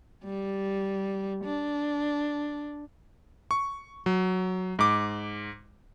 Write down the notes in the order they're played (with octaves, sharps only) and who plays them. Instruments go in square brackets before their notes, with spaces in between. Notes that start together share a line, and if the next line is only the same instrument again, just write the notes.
[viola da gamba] G3
D4
[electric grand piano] C#6
F#3
G#2 D6